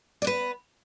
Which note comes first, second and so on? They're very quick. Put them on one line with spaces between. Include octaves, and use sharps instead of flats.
D5 B3 B4